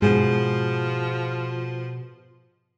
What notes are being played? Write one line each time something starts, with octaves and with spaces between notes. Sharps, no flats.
G#2 B2 F3 G#4